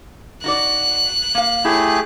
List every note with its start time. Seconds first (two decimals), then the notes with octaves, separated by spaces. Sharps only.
0.44 D#4 F#4 D5 F#6
1.35 A#3 F5
1.65 A3 E4 G4 G#4 C#5